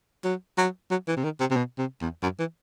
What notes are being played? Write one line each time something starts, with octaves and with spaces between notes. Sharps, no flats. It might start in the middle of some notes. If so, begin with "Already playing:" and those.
F#3
F#3
F#3
E3
C3
D#3
C3
C3
B2
C3
E2
F#2
E3